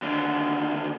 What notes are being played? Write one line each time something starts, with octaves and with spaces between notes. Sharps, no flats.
D#2 D3